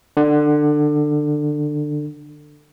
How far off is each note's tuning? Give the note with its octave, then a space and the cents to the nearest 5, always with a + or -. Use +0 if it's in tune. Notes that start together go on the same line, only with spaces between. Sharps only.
D3 +20